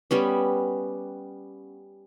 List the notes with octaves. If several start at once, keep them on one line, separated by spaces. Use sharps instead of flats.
G3 B3 C#4